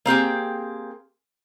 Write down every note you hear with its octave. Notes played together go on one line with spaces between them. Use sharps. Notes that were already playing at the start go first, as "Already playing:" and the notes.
A#3 C4 G4 G#4